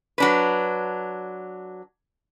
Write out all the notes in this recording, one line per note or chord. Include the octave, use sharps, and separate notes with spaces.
F#3 D4 B4